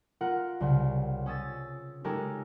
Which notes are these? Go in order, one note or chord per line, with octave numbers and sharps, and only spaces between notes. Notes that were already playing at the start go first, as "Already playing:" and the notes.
F4 A#4 F#5
C2 C#3 C6
C#4 D#6 E6 A6
G#3 C#4 D#4 G4 A4 A#4